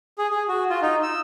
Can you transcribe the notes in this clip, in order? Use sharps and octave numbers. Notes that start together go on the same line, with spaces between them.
G#4
G#4
F#4
F4
D#4
E6